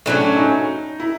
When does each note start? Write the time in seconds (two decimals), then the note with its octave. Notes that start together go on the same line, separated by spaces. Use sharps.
0.06 A2 F#3 A#3 C#4 D4
0.37 D#4
1.00 E4